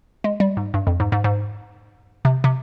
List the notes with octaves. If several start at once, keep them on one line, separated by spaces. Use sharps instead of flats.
G#3
G3
G#2
G2
F2
G#2
G#2
G#2
C3
C3